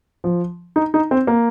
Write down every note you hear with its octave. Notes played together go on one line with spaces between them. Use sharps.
F3
D#4
D#4
C4
A#3